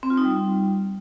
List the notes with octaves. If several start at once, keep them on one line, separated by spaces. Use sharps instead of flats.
C4
F4
D#4
G3